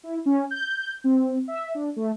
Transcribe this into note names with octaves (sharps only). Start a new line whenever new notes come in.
E4
C#4
G6
C4
E5
D4
A3